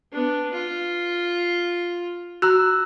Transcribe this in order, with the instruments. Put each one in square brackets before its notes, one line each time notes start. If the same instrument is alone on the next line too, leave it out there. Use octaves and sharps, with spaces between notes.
[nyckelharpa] B3 D4
F4
[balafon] F#4 [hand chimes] A#5 E6 F#6